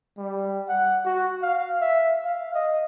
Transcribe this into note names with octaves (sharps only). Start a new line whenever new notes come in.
G3
F#5
F#4
F5
E5
F5
D#5